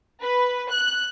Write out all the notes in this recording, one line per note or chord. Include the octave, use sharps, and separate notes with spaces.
B4
F#6